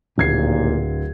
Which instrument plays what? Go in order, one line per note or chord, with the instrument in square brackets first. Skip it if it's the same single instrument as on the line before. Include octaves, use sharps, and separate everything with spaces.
[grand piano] D1 G#6 C7 [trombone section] D#2 A#2